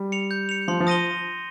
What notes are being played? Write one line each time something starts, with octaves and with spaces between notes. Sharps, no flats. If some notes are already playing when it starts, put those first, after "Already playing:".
Already playing: G3
C#7 F7
G6
C#7 F7
F3 C6
F3
D#6 A#6 D#7 G7